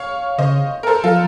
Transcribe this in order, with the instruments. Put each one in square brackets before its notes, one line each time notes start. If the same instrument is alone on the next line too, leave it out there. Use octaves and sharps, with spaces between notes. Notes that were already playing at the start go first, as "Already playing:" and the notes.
Already playing: [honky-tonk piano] C#5 F5
[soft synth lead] C#3 [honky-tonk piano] C5 D#5
[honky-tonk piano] A#4
A4 C5
[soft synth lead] F3 [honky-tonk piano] F4 A4